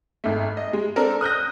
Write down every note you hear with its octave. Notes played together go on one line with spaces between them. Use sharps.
G#1 A3
D#5
G#3
C4 D4 A4 A#4
D#6 F#6 G6 A#6